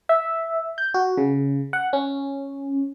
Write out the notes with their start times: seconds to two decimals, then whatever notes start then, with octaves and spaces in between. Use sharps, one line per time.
0.09 E5
0.78 G6
0.94 F#4
1.18 C#3
1.73 F#5
1.93 C#4